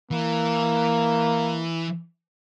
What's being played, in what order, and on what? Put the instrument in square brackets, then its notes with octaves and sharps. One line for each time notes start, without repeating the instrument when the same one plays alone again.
[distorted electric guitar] E3 [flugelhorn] A#3